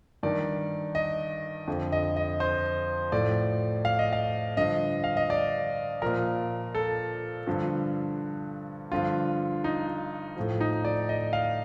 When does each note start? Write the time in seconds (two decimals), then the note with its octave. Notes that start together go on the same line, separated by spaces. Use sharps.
0.23 G2 D#3 D5
0.95 D#5
1.67 F2 D3 F3
1.92 D#5
2.17 D#5
2.40 C5
3.12 A2 F3 D5
3.85 F5
3.99 D#5
4.13 F5
4.57 G2 D3 F3 D#5
5.04 F5
5.17 D#5
5.30 D5
6.02 A#2 F3 A#4
6.75 A4
7.47 G2 D3 F3
8.92 G2 D3 F3 F4
9.64 D#4
10.36 A2 F3
10.61 D#4
10.85 D5
11.09 D#5
11.33 F5